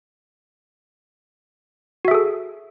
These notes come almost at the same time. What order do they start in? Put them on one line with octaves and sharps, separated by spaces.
F#4 E5 G#4 A4